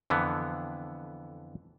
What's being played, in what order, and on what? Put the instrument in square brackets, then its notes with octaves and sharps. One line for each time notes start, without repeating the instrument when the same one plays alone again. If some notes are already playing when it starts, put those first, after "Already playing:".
[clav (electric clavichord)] F2 D3 E3 B3